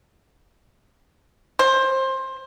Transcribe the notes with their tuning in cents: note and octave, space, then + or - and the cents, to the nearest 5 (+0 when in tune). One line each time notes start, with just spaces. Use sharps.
C5 +20